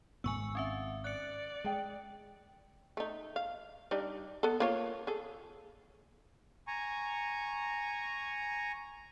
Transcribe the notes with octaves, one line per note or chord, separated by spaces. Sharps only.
G#1 G#2 B3 G#5 C#6 E6
C4 C#4 E5
D5 F#6 C#7
G#3 G#4 G5
A3 D#4
F5
G3 D4 D#4
B3 A4
A#3 F4 C#5
G#4 A4
G#5 A#5 C#6